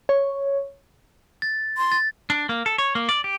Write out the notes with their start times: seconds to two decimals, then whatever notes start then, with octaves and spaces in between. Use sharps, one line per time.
0.09 C#5
1.42 A6
1.77 C6
1.92 A6
2.30 D4
2.49 A#3
2.66 A4
2.78 C#5
2.95 A#3
3.09 D5
3.24 G4